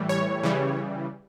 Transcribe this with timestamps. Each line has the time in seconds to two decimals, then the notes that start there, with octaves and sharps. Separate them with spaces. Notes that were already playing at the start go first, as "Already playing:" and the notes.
Already playing: A2 E3 G3
0.09 C#5
0.43 C#3 E3 G3